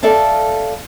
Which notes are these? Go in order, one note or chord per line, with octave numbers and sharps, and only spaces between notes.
A4 D5 E5 F5 A5